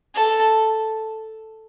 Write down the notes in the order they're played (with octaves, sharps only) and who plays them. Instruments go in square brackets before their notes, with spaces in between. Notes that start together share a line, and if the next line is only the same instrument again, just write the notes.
[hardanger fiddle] A4